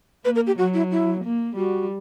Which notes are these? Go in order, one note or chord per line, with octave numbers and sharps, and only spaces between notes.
A#3 B4
A#4
G4
F#3 F#4
E4
E4
A#3
G3 F#4